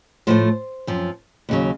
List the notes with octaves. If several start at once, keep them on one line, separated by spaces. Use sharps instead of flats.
A2 F3 A3 C5
F#2 F3 C4
D#2 C#3 F#3